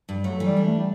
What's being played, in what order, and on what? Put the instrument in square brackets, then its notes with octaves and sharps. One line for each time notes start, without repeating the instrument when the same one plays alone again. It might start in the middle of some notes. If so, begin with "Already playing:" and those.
[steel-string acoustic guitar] G2
[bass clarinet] F#3 [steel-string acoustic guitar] A3
[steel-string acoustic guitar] E3
[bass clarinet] G3
[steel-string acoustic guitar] D4
[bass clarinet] A3
G3